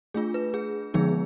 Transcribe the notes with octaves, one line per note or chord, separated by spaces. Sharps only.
A3 D4 F4 G#4
B4
G#4
D3 F3 G#3 B3 D#4 G#4